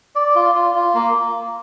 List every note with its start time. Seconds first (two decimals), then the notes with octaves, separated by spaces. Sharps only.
0.15 D5
0.35 F4
0.55 F4
0.75 F4
0.94 A#3